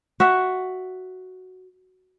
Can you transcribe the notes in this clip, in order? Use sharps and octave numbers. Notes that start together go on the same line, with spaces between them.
F#4 E5 F#5